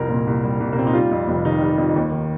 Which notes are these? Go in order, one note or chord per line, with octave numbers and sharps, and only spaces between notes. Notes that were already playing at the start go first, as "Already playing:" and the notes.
Already playing: C2 F2 A#4
A#2
C2
G3
C2
A#3
A#2 C4
D#4
G3 F4
F2
F1
D#3 D#4
G3
F2
D#2
D#3